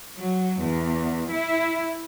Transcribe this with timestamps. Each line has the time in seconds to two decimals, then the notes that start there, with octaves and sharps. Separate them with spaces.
0.17 F#3
0.62 E2
1.33 E4